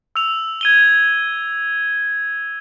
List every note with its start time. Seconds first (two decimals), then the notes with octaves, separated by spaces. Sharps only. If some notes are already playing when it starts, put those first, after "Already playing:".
0.16 E6 F7
0.61 G#6 D#7 G7